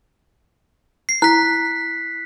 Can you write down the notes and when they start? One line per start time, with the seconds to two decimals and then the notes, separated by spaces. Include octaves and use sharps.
1.09 C7
1.22 E4 F#6 B6